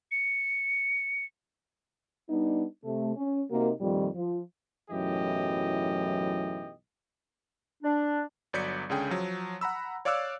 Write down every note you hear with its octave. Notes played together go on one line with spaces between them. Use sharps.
C#7
G3 B3 D4 D#4
C3 A3
C#4
C3 A#3 D#4 F#4 A#4
F2 A#2 D#3 G3
F3
B1 F#2 A2 E3 G4 D#5
D4
G1 F#3 D5 G6 B6 C#7
C#2 D3 C#4 G#4 G5
F3 F#3
F#5 A#5 B5 E6
C#5 D5 F5 D6 E6 F#6